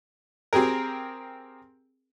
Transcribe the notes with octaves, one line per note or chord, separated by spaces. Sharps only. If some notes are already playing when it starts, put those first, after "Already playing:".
C4 G4 G#4 A#4